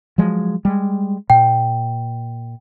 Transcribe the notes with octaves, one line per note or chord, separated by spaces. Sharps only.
F3 F#3 G#3
G3 G#3
A#2 G5